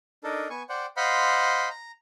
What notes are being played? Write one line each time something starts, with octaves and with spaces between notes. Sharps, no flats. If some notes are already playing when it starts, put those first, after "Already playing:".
D4 D#4 A4 A#4
B3 G#5 C#6
C5 D5 F#5 G5
C5 D#5 F5 F#5 B5 C6
A#5